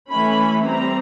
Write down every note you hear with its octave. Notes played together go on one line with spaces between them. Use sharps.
E3 A3 C#4 B5
G3 C4 A#5